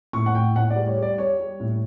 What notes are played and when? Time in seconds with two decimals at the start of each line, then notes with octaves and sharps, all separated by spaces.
0.13 A2 C#6
0.26 F#5
0.35 A2 G5
0.56 A2 F#5
0.70 D5
0.76 G3
0.87 C#5
0.97 G3
1.02 D5
1.18 G3 C#5
1.40 G3
1.60 A2